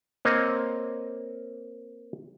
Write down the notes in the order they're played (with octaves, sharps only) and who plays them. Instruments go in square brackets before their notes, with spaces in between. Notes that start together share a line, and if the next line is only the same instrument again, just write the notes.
[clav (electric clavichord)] A#3 C4 C#5 D#5